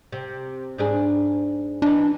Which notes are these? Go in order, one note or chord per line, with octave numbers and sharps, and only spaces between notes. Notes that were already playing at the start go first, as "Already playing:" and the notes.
C3
G#2 D4 G#4
E3 D4 D#4